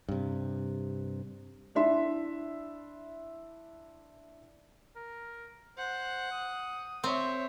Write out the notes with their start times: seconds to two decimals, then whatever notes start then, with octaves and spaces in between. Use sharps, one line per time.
0.09 G2 C3
1.75 D4 E4 E5 C6
4.96 A#4
5.78 C5 F#5
6.32 D#6
7.04 C4 C#5 E5